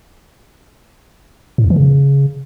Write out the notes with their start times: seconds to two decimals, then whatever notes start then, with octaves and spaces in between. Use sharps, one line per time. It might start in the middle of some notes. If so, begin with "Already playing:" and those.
1.58 A2
1.64 E2
1.70 E3
1.76 C#3